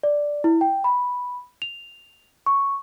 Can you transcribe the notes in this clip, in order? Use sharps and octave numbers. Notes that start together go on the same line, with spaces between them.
D5
E4
G5
B5
F7
C#6